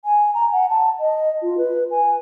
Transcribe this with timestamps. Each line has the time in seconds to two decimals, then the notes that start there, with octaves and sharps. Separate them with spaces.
0.05 G#5
0.34 A#5
0.52 F#5
0.70 A5
1.00 D#5
1.42 F4
1.58 B4
1.91 G#5